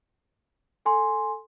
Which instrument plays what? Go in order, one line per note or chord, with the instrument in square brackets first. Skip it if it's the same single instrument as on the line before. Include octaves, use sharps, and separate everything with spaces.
[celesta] A4 G#5 C6